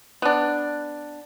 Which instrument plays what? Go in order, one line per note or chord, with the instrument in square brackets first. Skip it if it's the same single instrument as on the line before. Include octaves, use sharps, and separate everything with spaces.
[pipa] B3 D4